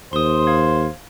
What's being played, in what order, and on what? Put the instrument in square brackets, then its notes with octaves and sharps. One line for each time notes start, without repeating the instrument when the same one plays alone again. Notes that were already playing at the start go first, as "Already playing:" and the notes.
[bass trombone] D#2 [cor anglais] C5 [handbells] C6 D#6
[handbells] F5 G#6